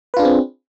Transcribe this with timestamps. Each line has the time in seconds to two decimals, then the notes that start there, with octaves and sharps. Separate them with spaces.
0.14 B4
0.17 F4
0.19 D4
0.22 G#4
0.25 C4